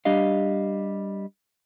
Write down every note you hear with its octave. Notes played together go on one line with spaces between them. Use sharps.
G3 D4 G4 D#5 F5